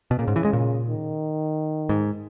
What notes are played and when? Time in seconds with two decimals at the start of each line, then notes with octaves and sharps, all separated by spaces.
0.11 B2
0.18 A#2 C#3
0.28 G#2
0.36 E3
0.45 G#3
0.53 A#2
0.87 D#3
1.89 G#2